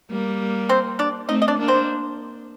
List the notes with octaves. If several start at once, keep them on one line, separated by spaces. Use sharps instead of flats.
G3 A#3
C4 C5
D4 D5
A3 C4 D#4 D#5
D#5
D4 D5
A#3 D4
C4 C5